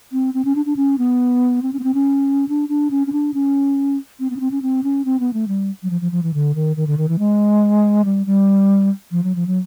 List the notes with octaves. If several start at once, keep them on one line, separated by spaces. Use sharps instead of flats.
C4
C4
C#4
D4
D4
C#4
B3
C4
C#4
B3
C4
C#4
D4
D4
C#4
C#4
D4
C#4
C4
B3
C#4
C4
C#4
C4
C#4
C4
B3
A3
G3
F#3
F3
F3
F3
E3
D3
D#3
D#3
D3
D#3
E3
G#3
G3
G3
F3
F#3
F3
F#3